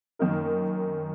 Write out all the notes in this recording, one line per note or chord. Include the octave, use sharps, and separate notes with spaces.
F#2 D#3 A#3 D#4 A#4